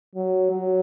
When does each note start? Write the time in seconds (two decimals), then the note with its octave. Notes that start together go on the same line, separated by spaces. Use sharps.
0.16 F#3
0.51 F#3